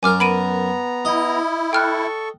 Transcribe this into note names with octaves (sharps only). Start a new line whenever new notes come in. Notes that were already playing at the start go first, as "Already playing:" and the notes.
F#2 A#4 G#5 D6 F6
B3 A#5 B5 D7 D#7
E4 D#5
A4 G5 C#6 F6 F#6